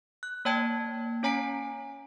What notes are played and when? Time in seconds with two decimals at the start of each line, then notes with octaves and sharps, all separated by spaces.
0.23 F#6
0.45 A#3 C#5 D5 G5 A5 G#6
1.23 C#4 C#5 G#5 A#5 B6 D7